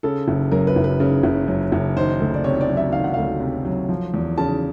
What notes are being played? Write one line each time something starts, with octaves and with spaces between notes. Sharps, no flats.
C#3 A4
F#1
F#2 A#4
B4
F#1
B4
C#3
F#1
F#2
F#1
D#3 C5
D2
D5
C3 C#5
D5
F#3
E5
D#3 F5
F#5
D2 F5
C3
F#3
F3
E2
C#3 A5